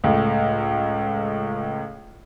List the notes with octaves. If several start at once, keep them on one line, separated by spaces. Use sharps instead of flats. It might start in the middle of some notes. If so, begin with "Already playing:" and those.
C#2 A2